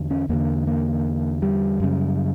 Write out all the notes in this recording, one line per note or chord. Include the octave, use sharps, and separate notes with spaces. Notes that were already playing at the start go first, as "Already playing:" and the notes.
Already playing: E2 D3
C#4
E2 D3 A#3
A#3
G3
F#2 C#3